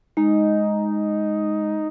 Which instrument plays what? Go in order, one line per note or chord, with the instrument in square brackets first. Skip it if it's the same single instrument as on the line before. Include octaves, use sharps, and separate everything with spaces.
[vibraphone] G#3 [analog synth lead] D#4